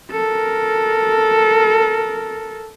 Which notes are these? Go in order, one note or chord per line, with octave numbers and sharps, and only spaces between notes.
A4 A#4